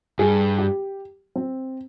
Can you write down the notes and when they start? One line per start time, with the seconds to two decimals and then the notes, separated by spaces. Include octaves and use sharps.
0.19 G2 G#4
0.58 G4
1.35 C4